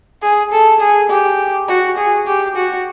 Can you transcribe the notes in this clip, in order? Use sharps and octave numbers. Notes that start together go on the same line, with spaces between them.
G#4
A4
G#4
G4
F#4
G#4
G4
F#4